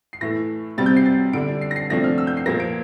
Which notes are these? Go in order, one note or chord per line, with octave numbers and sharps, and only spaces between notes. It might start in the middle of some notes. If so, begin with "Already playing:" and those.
C7
A2 E3 A3 A#6
C3 G3 C4 A6
G6
C7
A6
D3 G3 D4 D7
C7
A#6
C7
C3 F3 A3 D4 A#6
F6
E6
G6
C7
A#2 F3 A#3 A#6
D7